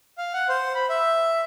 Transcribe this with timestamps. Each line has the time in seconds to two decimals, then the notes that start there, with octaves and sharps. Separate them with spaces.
0.18 F5
0.33 F#5
0.49 C5
0.75 B5
0.90 E5